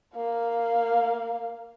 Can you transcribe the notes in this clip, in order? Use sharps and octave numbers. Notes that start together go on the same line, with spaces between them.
A#3 F5